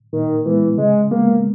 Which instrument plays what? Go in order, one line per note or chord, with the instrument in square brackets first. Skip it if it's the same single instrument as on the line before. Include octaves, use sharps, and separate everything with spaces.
[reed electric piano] A#2 [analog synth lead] D#3
[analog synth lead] E3 [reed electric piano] G#3 B3
[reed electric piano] C#3 [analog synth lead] G#3
[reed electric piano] G#3 B3 [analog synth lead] A#3